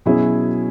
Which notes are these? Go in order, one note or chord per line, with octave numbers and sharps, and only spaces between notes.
B2 F#3 C#4 E4 G#4